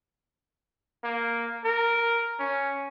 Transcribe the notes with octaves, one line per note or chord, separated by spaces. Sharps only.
A#3
A#4
C#4